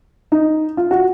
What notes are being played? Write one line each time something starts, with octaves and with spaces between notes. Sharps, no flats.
D#4
F4
F#4